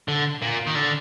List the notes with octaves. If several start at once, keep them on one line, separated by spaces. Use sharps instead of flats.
D3
A#2
D#3
D3